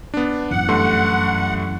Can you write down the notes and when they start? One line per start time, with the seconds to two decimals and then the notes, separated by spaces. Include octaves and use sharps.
0.14 B3 D4
0.51 F#2 A2 E3 F#5
0.68 G2 A3 C6